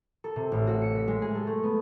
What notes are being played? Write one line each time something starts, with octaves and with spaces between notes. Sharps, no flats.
A4
C3
A1
F#4
C#7
B6
G#3
G#4
A4
A3
B3